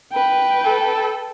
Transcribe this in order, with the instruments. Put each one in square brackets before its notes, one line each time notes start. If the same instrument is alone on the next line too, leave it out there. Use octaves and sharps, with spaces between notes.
[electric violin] B4 G5
[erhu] A4